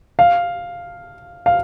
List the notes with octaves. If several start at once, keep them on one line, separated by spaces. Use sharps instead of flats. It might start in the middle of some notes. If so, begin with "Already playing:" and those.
F5
F5